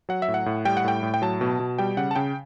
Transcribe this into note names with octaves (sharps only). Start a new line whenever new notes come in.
F#3 F#5
E5
A2
F#5
A2
G3 G5
F#5
A2 G5
A2
G5
F#3 A5
B2
B2
G3 G5
C#3 F#5
A5
C#3 G5